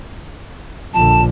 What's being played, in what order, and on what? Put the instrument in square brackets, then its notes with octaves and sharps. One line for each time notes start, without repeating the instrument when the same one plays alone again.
[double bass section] A#1 D3 F3 [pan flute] A5